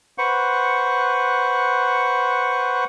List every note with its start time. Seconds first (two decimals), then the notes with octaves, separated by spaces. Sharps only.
0.18 B4 C5 F#5 C#6